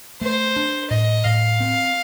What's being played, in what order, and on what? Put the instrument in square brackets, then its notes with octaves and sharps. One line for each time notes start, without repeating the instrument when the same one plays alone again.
[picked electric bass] A3 [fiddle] C5
[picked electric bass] D4
[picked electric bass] A2 [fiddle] D#5
[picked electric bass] A2 [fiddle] F5
[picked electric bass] C4